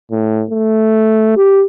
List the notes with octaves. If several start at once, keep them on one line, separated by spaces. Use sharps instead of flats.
A2
A3
G4